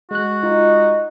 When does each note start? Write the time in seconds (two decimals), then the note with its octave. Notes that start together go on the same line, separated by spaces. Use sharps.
0.11 G#3 F#4 F#6
0.43 D#4 F4